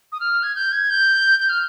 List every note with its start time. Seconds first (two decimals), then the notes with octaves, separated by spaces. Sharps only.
0.12 D#6
0.20 F6
0.43 G#6
0.55 G6
0.72 G#6
0.90 G6
1.39 G6
1.49 F6